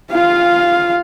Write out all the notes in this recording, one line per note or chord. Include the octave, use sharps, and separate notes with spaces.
F4 F5